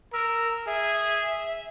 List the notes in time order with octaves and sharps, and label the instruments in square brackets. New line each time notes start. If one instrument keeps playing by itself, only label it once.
[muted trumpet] A#4 [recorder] E6
[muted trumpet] G#4 [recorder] E5